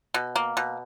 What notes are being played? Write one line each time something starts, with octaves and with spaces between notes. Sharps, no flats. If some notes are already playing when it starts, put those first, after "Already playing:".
B2
A#3
B2